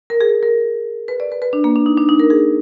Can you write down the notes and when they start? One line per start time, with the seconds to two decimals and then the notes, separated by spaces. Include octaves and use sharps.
0.10 A#4
0.21 G#4
0.43 A#4
1.08 B4
1.20 D5
1.32 B4
1.42 B4
1.53 D4
1.64 A#3
1.76 D4
1.86 D#4
1.97 D4
2.09 D#4
2.20 A#4
2.30 G#4